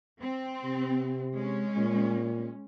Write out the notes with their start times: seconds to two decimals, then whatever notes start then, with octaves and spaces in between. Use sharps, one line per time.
0.21 C4
0.64 C3
1.34 G#3 C#4
1.77 A#2